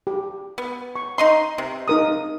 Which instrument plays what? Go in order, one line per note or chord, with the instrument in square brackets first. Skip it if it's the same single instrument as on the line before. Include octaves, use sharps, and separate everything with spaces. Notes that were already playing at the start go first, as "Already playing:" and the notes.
[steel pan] G4
[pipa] B3
[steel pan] C#6
[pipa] D#4 D#5 C6
C3
[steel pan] D#4 A#4 D#6